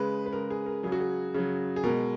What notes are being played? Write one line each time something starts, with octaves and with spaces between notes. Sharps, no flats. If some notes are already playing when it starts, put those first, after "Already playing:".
Already playing: C#3 G#3 B4
B4
C#3 G#3 A#4
G#4
A#4
C#3 F#3 G#4
F#4
G#4
C#3 F#3
G#4
B2 G#3 A#4